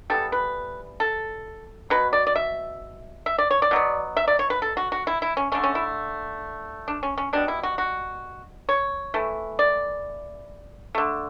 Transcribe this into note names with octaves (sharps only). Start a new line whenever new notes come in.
E3 G3 B3 A4
B4
A4
B2 F#3 B4
D5
D5
E5
E5
D5
C#5
D5
B2 F#3 B3
E5
D5
C#5
B4
A4
F#4
F#4
E4
E4
C#4
D3 A3 C#4
C#4
E4
D4
C#4
C#4
B2 G3 B3 D4
E4
F#4
F#4
C#5
E3 A3
D5
D3 A3